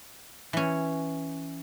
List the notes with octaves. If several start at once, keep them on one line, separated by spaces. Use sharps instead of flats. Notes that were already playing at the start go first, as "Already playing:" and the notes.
E3 C#4